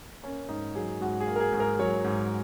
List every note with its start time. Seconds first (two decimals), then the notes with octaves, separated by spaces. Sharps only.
0.23 A#3 C#4
0.49 G#2 D#4
0.75 F#3 G#4
1.01 G#2 F#4
1.20 G#4
1.27 A#3
1.36 A#4
1.40 G#4
1.52 G#2
1.60 A#4
1.79 F#3 C#5
2.04 G#2